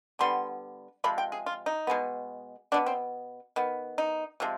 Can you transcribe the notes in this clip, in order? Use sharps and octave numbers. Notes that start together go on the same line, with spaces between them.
D3 G3 B3 C6
C3 F3 G#3 B5
G5
G#4
F4
D#4
B2 G#3 B3
B2 B3 D4
C4
D#3 B3
D#4
C3 F3 G#3